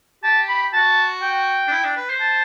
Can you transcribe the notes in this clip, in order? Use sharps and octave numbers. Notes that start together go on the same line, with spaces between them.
G4 A5
B5
F#4 A5
G5
D4
E4
D4
B4
C5
A5